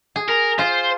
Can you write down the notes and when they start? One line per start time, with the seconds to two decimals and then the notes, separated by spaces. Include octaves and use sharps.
0.16 G#4
0.28 A#4
0.59 F4 C5